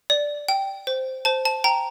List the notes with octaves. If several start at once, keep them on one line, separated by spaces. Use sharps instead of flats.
D5
G5
C5
C5 A5
A5
G5 A#5